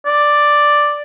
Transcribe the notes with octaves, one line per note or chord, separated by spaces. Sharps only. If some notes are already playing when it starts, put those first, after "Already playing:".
D5